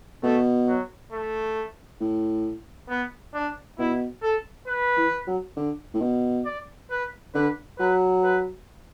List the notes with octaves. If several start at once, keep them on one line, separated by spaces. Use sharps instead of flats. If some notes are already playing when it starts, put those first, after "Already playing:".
B2 A3
F#3
A3
A2
B3
D4
B2 E4
A4
B4
E3
F#3
D3
A2
B2
D5
B4
D3 B4
F#3 B4
B4